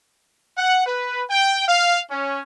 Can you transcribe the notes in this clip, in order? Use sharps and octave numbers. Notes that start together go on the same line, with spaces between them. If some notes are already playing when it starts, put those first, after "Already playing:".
F#5
B4
G5
F5
C#4